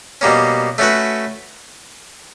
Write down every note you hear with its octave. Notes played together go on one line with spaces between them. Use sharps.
B2 G3 A#3 C#4
A3 C#4 F#4 B4